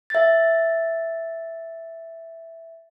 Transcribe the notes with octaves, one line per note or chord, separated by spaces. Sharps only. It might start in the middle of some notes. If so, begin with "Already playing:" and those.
E5 A6